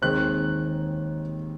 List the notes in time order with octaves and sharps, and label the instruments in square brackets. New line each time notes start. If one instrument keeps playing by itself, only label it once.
[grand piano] D#2 D#3 G#3 C4 F#6